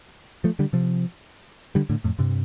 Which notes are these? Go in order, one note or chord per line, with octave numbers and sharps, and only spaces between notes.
F3 A3
D3 G3
C3 F3
D3 G3
A2 D3
F2 A2
G2 C3